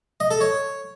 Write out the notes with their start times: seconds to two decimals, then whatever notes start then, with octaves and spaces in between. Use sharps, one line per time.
0.20 D#5
0.30 A4
0.41 C#5